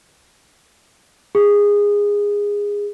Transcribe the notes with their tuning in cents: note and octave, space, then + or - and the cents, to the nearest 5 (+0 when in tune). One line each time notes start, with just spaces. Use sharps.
G#4 -20